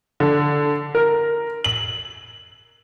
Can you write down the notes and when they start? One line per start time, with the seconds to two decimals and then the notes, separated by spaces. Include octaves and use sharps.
0.20 D3
0.95 A#4
1.64 F#7